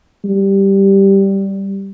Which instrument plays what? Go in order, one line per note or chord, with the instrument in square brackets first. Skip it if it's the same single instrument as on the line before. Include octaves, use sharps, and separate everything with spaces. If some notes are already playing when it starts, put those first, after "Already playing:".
[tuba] G3